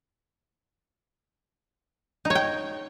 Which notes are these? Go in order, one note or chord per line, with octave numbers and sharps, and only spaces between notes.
D#4
C#5
G5